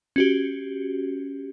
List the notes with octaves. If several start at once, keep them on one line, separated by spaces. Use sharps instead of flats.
C#4 F#4 G4